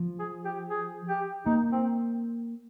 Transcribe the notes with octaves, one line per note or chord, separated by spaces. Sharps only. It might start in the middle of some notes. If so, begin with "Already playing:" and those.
Already playing: F3
G#4
G4
G#4
G4
A#3 D#4
C4